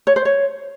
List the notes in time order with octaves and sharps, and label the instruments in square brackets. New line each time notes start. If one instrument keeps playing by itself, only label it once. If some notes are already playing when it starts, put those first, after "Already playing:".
[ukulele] C#5
C5
C#5